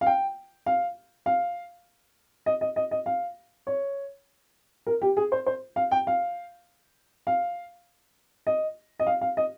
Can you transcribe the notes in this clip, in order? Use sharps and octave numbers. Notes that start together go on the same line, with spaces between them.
F5
G5
F5
F5
D#5
D#5
D#5
D#5
F5
C#5
A#4
G4
G#4
C5
C5
F5
G5
F5
F5
D#5
D#5
F5
F5
D#5